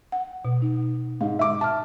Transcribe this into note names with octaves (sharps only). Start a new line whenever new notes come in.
F#5
B2
D#4
G#2 F5
E5 D6
E5 A5 F6